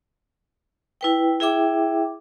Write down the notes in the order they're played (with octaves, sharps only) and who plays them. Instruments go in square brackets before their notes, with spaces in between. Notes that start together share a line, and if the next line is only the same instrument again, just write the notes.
[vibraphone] E4 B4 G5
E4 G#4 E5 G5 D6